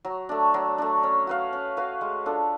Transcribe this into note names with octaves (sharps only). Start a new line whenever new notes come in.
F#3
A3 D4
F#3
A3 D4
C#4
F#4 B4 F5
C#4
F#4 B4 F5
G#3
D4 F4 A4